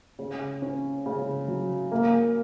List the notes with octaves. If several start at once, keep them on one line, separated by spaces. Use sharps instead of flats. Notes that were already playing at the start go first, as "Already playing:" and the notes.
C#3
C#4
C#3
F#3
A#3